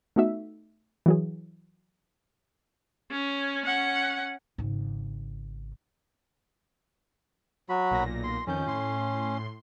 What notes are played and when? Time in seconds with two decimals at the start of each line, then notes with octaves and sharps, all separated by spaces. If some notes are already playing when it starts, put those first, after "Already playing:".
0.16 A3 B3 D#4 F#4 E5
1.06 E3 F#3 G#4
3.11 C#4
3.65 C#4 F#5
4.58 G#1 C#3
7.69 F#3 F#4 B5
7.91 B1 A#2 A#6
8.24 C6
8.47 F2 D#3 C#4 G6
8.66 A2 C6